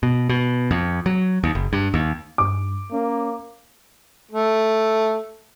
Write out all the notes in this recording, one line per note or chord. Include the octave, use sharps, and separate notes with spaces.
B2
B2
F2
F#3
D#2
F#1
G2
D#2
G2 D6
A#3 C#4
A3